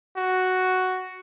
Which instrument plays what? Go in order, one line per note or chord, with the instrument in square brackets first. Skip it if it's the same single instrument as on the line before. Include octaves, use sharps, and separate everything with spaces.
[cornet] F#4